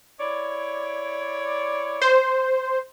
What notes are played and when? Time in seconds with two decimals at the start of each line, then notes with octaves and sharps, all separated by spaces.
0.19 E4 C#5 D5
2.02 C5